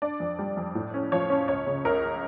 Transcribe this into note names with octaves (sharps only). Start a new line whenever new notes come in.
D4 D5
F2
G3
F2
A2
C#4
F3 C#5
C#4
C#2 C#5
C#3
C#2 A#4